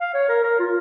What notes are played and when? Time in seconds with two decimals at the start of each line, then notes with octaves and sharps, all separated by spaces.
0.01 F5
0.14 C#5
0.29 A#4
0.43 A#4
0.59 F4